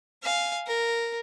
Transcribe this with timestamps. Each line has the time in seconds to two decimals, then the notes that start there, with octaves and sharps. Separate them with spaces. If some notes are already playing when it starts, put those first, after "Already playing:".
0.23 F5 G#5
0.67 A#4